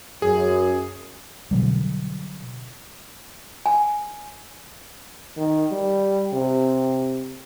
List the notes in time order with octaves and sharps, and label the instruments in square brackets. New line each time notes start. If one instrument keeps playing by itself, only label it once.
[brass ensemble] F#2 [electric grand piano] G#4
[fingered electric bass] B2 D3 F#3 G3
[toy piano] G#5
[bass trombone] D#3
G3
C3